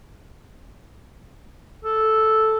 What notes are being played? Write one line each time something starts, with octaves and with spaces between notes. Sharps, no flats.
A4